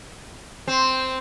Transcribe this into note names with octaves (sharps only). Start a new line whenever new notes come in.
C4